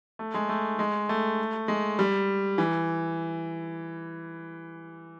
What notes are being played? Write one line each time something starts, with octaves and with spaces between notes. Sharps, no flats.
A3
G#3
A3
G#3
A3
G#3
G3
E3